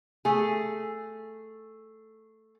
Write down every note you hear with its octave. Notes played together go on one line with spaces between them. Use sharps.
A3 G#4